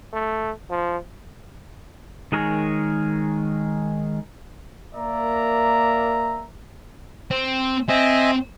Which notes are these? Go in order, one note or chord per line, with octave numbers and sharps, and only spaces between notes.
A3
F3
D#3 G#3 G#4 A#4 C#5
A#3 A#4 D5 E5 A#5
C4
C4 D#5 E5 G#5